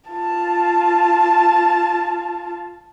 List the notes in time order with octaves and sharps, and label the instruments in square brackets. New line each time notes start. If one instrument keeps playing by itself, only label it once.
[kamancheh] F4 A5